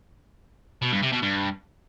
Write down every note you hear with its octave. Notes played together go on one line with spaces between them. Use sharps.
B2
G2
C3
B2
G2